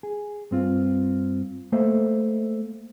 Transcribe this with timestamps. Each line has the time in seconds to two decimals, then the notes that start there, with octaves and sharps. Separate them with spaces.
0.03 G#4
0.51 G2 C4 F4
1.72 A3 A#3 A4 C5 D#5 E5